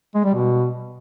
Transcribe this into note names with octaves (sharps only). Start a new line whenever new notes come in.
G#3
G3
B2